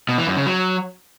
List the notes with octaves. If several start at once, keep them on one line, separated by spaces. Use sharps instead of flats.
B2
E3
F#2
C#3
F#3